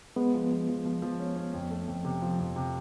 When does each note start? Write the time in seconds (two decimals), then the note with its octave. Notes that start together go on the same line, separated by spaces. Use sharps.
0.16 G#3 B3
0.34 F3
0.51 F3
0.68 F3
0.85 F3
1.02 F3
1.19 C#4
1.36 C#4
1.54 F2
1.70 A3
1.88 F2
2.05 C3
2.22 F3
2.39 F2
2.56 C3